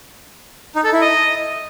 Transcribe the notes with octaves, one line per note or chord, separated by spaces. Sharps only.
D#4
A4
E4
D#5